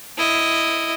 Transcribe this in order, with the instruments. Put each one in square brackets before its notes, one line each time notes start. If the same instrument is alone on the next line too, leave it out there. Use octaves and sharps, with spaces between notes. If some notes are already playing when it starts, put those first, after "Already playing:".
[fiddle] E4 D#5